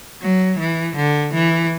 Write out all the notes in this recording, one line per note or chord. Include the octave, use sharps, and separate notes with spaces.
F#3
E3
D3
E3